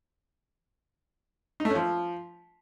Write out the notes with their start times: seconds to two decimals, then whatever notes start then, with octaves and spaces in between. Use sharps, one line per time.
1.60 D#4
1.65 A3
1.70 C#4
1.75 F3